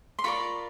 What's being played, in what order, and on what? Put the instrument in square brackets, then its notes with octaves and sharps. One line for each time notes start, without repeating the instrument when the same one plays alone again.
[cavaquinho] C6
F4 A#4 D5 B5 C#6